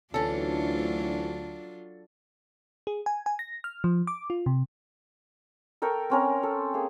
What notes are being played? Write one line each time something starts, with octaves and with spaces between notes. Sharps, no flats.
D2 E3 F#3 C#4 D4 F4 A4
G#4
G#5
G#5
A#6
F6
F3
D6
F4
C3
A4 A#4 G5 C#6
C4 C#4 A#4
A4
A#3 G#4